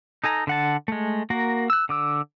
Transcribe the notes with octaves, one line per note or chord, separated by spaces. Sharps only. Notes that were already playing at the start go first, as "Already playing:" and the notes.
D#4 A4 G#5 A#5
D3 F#5 A5
G#3 A3
A#3 F#4 A#4
E6 F#6
D3 D6 E6